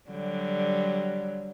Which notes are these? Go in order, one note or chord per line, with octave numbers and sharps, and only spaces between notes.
D3 F#3 G3